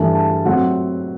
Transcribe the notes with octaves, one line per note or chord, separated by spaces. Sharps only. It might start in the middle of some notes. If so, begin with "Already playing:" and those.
Already playing: G2 E3 A3 A5
A5
A2 F#3 C4 F#5